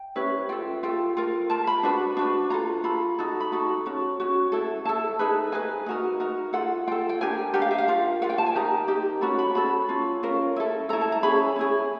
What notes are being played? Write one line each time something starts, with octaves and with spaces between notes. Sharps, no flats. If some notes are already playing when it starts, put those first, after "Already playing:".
Already playing: G5
C#4 E4 G4 B4
F4 A4 G5
F4 A4 G5
F4 A#4
F4 A#4 A5
B5
D4 F#4 B4
D4 F#4 B4
F4 A4 A#5
F4 A4 B5
D#4 F#4 A4
B5
D#4 F#4 A4
C#4 F#4
C#4 F#4
E4 A4
E4 A4 A5
D#4 G#4 B4
D#4 G#4 B4 G#5
D#4 F#4 A#4
D#4 F#4 A#4
F4 A4 F#5
F4 A4 G5
G5
D4 G4 A#4 G#5
D4 G4 A#4 F#5
F5
E5
F5
F4 A#4
F4 A#4 F#5
G5
A5
G#5
D#4 G4 A#4 A#5
D#4 G4 A#4
C#4 F#4 A4 B5
B5
C#4 F#4 A4 B5
C#4 F4
C#4 F4 A#4
E4 A4
E4 A4 A#5
A5
A#5
C#4 E4 G#4 B5
C#4 E4 G#4